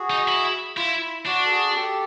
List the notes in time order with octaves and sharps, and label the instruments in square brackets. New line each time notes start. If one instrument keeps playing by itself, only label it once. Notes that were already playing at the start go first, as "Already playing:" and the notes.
Already playing: [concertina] F#4 G#4
[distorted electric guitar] D#4
E4
[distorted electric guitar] E4 [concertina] F4
[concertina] E4
[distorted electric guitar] D4 [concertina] F#4
[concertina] A4
F#4 G#4
G4 A4